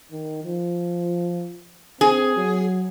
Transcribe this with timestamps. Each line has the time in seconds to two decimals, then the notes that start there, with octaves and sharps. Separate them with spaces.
0.12 D#3
0.44 F3
2.01 C4 G#4
2.37 F#3